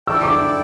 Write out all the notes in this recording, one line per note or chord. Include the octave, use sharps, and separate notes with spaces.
E4 A4 D5 G5 E6
D6